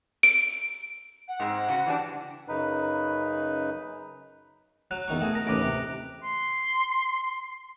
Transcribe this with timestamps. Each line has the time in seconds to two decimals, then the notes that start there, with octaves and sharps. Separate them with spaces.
0.23 D7
1.28 F#5
1.40 G#2 G#3 C4
1.68 C#3 F#4
1.86 E3 G3 D4
2.48 F#2 C#3 D#4 B4
4.91 F#3 F#6
5.08 E2 D#3 C#6
5.20 A3 F#4 G#4
5.35 A#4 A#6
5.47 A1 D#2 B4 D6 A#6 D7
5.62 C3
6.24 C6